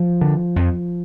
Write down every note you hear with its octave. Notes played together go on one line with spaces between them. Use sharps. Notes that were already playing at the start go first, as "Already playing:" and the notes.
Already playing: F3
D3
F2